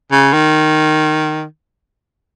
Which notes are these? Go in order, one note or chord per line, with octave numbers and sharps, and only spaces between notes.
C#3
D#3